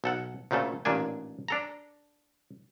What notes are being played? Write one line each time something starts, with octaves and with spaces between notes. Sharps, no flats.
B1 A4 F#5
D2 A#2 C#3 A3 A4
A1 A#2 D#3 D4 G#5
D4 A4 A#5